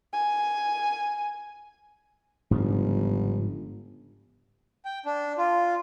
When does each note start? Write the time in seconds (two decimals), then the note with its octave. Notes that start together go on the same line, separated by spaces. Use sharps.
0.13 G#5
2.51 G1 G#2 C#3 F3
4.84 G5
5.06 D4
5.38 F4